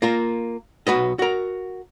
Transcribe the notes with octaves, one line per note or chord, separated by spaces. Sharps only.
A#3 F4 A#4
B1 F#4 B4 D#5
F#4 A#4